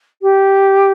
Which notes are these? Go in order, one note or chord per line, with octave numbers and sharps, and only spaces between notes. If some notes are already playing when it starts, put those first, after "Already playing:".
G4